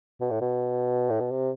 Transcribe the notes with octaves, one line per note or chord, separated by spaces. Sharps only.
B2
A2
B2
A2
B2
C3